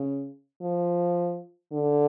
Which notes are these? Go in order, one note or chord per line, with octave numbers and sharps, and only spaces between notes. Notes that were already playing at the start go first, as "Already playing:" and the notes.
Already playing: C#3
F3
D3